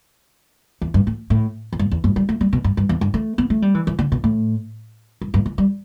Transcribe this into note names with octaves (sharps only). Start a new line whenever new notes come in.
E2
G2
A2
A2
E2
G2
E2
G2
G3
A3
G3
B2
G2
G2
E2
G2
A3
B3
A3
G3
E3
E3
D3
B2
A2
G2
G2
E3
G3